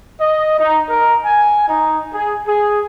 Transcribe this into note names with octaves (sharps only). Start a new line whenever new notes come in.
D#5
D#4
A#4
G#5
D#4
G#4
G#4